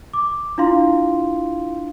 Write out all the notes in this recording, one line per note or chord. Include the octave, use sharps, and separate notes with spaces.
D6
D4 E4 F4 F5 C6